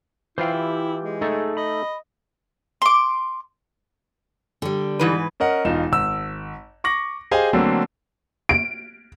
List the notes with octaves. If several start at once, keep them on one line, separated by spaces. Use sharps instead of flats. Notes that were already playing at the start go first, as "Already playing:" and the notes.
E3 E4 F4 C5 F5 G5
G4
G#3
A3 D#4 G#4 A4
D#5 B5
C6 D6
D3 G3
G#2 E3 B4
C#4 A#4 D#5 F#5
E1 D#4 F4 E7
G#1 E6
C#6 D6 A#6 F#7
G4 G#4 C5 D#5 F5 G#5
D3 F#3 A3 A#3 C4
D7